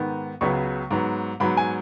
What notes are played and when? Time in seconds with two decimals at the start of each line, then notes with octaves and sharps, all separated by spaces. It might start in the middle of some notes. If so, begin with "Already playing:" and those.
Already playing: G#2 D#3 B3
0.41 C#2 C#3 F#3 B3 C#6
0.91 G#2 F#3 B3
1.40 G#2 F#3 B3 B5
1.57 G#5